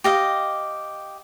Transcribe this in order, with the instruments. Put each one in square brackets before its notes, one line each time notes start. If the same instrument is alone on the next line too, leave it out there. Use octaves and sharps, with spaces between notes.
[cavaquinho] G4 D#5 F5